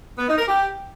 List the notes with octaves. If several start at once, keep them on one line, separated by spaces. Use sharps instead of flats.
B3
D#4
A#4
G4